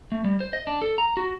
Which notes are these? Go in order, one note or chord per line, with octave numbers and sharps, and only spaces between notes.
A3
G3
C5
D#5
D4
A4
A#5
F#4